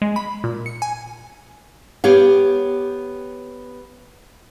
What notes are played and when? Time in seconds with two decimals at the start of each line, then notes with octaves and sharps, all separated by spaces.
0.02 G#3
0.16 B5
0.44 A#2
0.66 C#7
0.82 G#5
2.04 B3 G4 C#5 F5